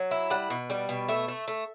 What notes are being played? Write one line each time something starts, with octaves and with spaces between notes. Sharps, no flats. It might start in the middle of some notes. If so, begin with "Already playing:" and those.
Already playing: F#3
E4
G3 F#5
B2
G3
B2
A3 E5
A3
A3